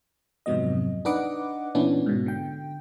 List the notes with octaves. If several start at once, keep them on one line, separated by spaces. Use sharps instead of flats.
F2 G#2 C3 F#3 B3 D#5
D4 D#4 B4 D#5 F#5 D6
A#2 E3 B3 C#4 D4 E4
G#2 B2
D3 G5